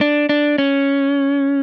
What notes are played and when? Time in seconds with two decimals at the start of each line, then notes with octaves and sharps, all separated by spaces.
0.01 D4
0.29 D4
0.58 C#4